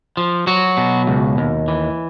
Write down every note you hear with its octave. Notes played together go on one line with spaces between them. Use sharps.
F3
F#3 F#4
B2
C#2
D#2
E3